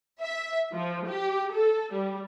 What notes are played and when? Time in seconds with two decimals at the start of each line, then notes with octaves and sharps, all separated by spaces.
0.20 E5
0.73 F3
1.05 G4
1.51 A4
1.92 G3